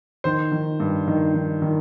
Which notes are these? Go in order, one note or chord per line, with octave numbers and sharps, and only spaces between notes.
D#3 C5
D#3
G2
D#3
D#3
D#3